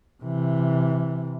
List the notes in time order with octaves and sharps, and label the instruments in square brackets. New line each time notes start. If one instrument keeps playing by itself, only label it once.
[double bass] C3 E3